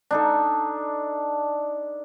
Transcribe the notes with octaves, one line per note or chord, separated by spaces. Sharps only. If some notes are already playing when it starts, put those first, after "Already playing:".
D4 D#4 A4